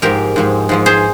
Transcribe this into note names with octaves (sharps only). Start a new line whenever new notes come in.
G#2 F3 G#3 G4 A#4
G#2 F3 G#3
G#2 F3 G#3
G#4 C5